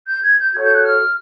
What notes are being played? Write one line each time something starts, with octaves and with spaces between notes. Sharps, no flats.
G6
G#6
G6
F#4 A4 C#5 G#6
G6
F#6
F6